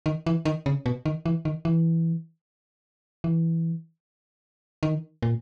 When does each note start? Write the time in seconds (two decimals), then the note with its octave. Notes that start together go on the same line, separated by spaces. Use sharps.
0.06 D#3
0.26 E3
0.45 D#3
0.66 C#3
0.86 B2
1.06 D#3
1.26 E3
1.45 D#3
1.65 E3
3.24 E3
4.83 D#3
5.22 A#2